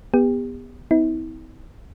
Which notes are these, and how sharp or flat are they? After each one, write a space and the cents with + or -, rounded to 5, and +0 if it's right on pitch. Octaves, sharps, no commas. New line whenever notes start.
B3 -5 G4 +35
B3 +45 E4 -45